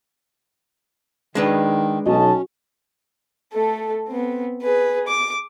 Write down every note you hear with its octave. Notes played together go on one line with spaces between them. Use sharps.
D#3 G#3 D4 B4
B1 C#4 F#4 D#5 A5
A3 A4
B3 C4
G#4 B4
D6